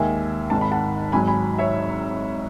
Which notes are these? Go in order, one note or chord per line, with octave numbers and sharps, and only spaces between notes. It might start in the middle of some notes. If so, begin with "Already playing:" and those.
Already playing: D#2 D#3 G#3 E5 G#5
G#1 G#2 D#3 A5
B5
F#5 A5
G#1 G#2 F#3 G#5 B5
G#5 B5
C#5 E5